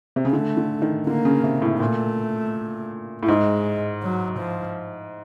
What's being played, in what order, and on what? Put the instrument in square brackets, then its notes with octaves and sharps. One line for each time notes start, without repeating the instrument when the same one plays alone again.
[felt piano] C3
C#3
[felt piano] D3 [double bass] A3
[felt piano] D3
D#3
[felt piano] D3 [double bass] A#3
[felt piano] C#3
C3
A2
[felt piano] A#2 [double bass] A3
[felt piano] A2
[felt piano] G#2 [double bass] G#3
[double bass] F#3
F3